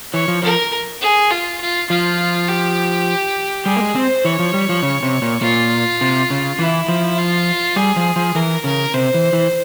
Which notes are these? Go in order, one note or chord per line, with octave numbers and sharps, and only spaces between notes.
E3 C#5
F3
F3 A#4
G#4
F4
F4
F3 F4
G4
G3 G#4
A#3
G#3
C4 C5
E3 C#5
F3
G3
F3
C#3
C3
A#2
A#2 F4
C3
C#3
E3 E4
F3
F4
G3 G#4
F3
F3
E3 A#4
C#3 A#4
C3 C5
E3
E3